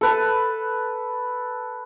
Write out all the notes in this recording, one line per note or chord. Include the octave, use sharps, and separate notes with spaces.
A4 B4 A5